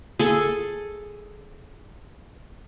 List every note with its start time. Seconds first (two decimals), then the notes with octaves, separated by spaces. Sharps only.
0.19 G#4 A4